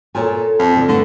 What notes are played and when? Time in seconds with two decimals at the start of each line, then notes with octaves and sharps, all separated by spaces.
0.15 A#2 A4 C#5 G#5
0.59 F2
0.73 D3 F4
0.88 D3 A3 E4 B4